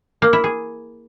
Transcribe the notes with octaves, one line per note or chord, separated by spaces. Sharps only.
A#3
E4
G#4